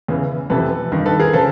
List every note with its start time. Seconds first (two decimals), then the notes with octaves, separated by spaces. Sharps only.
0.08 E2 C#3 E3
0.50 F2 C3 E3 A4 B4
0.92 G2 D#3
1.06 A4 B4
1.20 G#4 A#4
1.33 C#3 F3 A4 B4